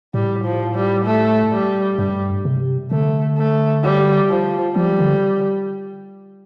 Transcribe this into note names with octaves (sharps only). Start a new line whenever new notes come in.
A2 G3
F3
G3
A3
G3
G2 G3
C3
D3 A3
A3
G3
F3
F3 G3
D3